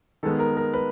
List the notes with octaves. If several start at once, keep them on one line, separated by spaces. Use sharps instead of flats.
D#3 G#3 B3 A4
A#4
A#4
B4